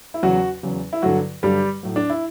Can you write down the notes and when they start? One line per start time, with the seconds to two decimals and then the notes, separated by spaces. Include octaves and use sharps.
0.14 E4
0.23 E2 C#3 F#3 F#4
0.63 E2 C#3 F#3
0.93 E4
1.02 G2 D3 F#3 F#4
1.43 G2 D3 F#3 G3 G4
1.83 A2 F#3
1.96 D4
2.10 E4